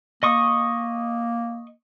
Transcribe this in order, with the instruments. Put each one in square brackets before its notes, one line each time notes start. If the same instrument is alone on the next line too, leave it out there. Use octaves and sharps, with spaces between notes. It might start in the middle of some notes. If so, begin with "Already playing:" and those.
[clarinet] A#3 [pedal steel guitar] D#5 C#6 D#6